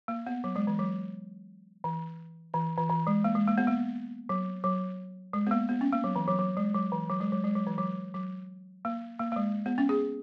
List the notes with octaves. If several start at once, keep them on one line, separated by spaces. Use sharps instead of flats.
A#3
B3
F#3
G#3
E3
F#3
E3
E3
E3
E3
G#3
A#3
G#3
A#3
B3
A#3
F#3
F#3
G#3
B3
A#3
B3
C#4
A#3
F#3
E3
F#3
F#3
G#3
F#3
E3
F#3
G#3
F#3
G#3
F#3
E3
F#3
F#3
A#3
A#3
A#3
G#3
B3
C#4
G#4